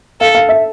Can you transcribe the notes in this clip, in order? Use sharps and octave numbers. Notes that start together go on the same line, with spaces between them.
A4 F5
F5
E5